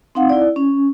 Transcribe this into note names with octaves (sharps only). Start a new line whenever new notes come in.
C4 D#4 F5 F#5
E4 D5
C#4